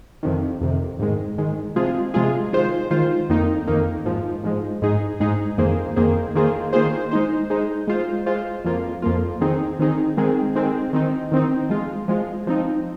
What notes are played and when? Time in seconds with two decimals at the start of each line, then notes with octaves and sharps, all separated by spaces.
0.23 F2 C3 D#3
0.61 F2 C3 D#3
0.99 G#2 D#3 G#3
1.38 G#2 D#3 G#3
1.76 C3 F3 G#3 F4 G#4
2.14 C3 F3 G#3 F4 G#4
2.53 D#3 G#3 F4 C5
2.91 D#3 G#3 F4 C5
3.29 F2 D#3 A#3 D#4
3.67 F2 D#3 A#3 D#4
4.05 G#2 F3 G#3
4.43 G#2 F3 G#3
4.82 G#2 G#3 D#4 G#4
5.20 G#2 G#3 D#4 G#4
5.58 F2 D#3 A#3 G#4 C5
5.96 F2 D#3 A#3 G#4 C5
6.35 D#3 A#3 F4 G#4 C5
6.73 D#3 A#3 F4 G#4 C5
7.11 G#3 D#4 C5
7.50 G#3 D#4 C5
7.87 G#3 F4 C5
8.26 G#3 F4 C5
8.65 F2 F3 A#3 F4
9.02 F2 F3 A#3 F4
9.41 D#3 C4 D#4 G#4
9.79 D#3 C4 D#4 G#4
10.17 D#3 G#3 C4 G#4
10.55 D#3 G#3 C4 G#4
10.93 D#3 C4 D#4
11.32 D#3 C4 D#4
11.70 F3 G#3 F4
12.08 F3 G#3 F4
12.47 F3 C4 D#4